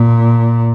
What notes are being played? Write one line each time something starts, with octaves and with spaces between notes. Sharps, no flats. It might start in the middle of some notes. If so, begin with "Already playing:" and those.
Already playing: A#2